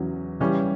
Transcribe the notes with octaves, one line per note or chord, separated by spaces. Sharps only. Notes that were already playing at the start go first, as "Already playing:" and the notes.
Already playing: E2 C#3 F#3 C#4
C#3 E3 G3 C#4